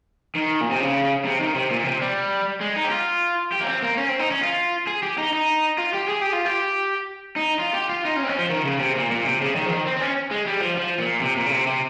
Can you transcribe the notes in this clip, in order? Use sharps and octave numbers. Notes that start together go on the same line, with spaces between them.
D#3
A#2
C3
C#3
C3
D#3
C3
A#2
C3
G3
G#3
D#4
G4
F4
G4
A#3
C4
A#3
C#4
C4
D#4
C#4
F4
G#4
G4
D#4
D#4
F4
G4
G#4
G4
F4
G4
D#4
F4
G4
F4
D#4
C#4
C4
C#4
F3
D#3
C#3
C3
A#2
A#2
C3
C#3
D#3
F3
D#3
C4
C4
C#4
G#3
G3
F3
F3
A#2
C3
A#2
C#3
C3
C3